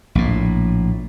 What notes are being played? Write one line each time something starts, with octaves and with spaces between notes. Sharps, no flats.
A#1 A2